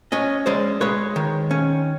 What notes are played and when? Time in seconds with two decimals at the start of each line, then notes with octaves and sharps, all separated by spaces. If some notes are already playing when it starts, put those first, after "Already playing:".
0.12 C#4 C#5 D#5
0.46 G#3 C5 D5
0.81 G#3 B4 C#5
1.16 D#3
1.51 C#4